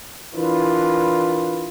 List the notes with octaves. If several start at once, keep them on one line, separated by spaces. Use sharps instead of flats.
E3 D4 E4 F4 A#4 B4